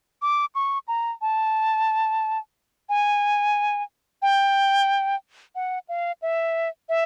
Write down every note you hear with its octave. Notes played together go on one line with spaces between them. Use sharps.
D6
C#6
A#5
A5
G#5
G5
F#5
F5
E5
E5